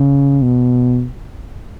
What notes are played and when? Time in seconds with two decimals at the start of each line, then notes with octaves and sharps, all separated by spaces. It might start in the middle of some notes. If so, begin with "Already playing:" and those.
Already playing: C#3
0.42 B2